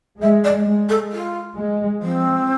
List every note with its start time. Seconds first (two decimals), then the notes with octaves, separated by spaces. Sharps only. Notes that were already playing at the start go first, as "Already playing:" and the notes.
0.21 G#3 E5
0.44 D5
0.66 G#3
0.89 A4
1.12 F4
1.57 G#3
2.02 F3 C4